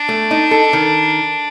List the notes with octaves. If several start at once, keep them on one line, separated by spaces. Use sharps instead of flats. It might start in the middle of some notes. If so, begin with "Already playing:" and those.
Already playing: D4
A3
D#4
A4
D#3